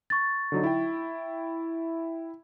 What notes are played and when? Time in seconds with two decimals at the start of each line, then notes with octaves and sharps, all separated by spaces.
0.10 C#6 A6
0.52 D3 F#3 D#4
0.64 E4 G5